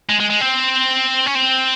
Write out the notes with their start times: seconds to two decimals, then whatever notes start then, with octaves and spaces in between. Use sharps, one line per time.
0.09 G#3
0.20 G#3
0.30 G#3
0.40 C4
1.26 C#4
1.35 C4